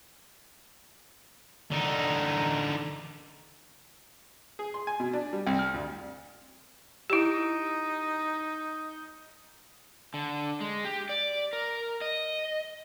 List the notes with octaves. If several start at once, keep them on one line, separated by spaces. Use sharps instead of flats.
D3 D#4
G#4
C6
G#5
B2
D4
G3
C2
F6
D2
D#4 E4 G4
D3
G#3
G4
D5
A#4
D#5